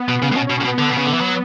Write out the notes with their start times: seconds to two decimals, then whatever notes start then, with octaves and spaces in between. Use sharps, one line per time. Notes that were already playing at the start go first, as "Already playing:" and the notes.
Already playing: B3
0.08 B2
0.22 C#3
0.32 A2
0.36 B2 C#4
0.47 C#4
0.50 B2
0.58 A2 C#4
0.64 B2
0.68 B3
0.79 D3
0.90 B2
0.97 C#3
1.05 D3
1.14 E3
1.21 F#3